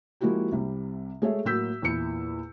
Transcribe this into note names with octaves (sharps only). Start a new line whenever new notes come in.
F3 G#3 A#3 E4 F#4 G4
C2 C3 G3
G#3 A3 G#4 A4 C#5 E5
A2 F#3 A#3 E6 G6 B6
E2 A#2 E4 C#7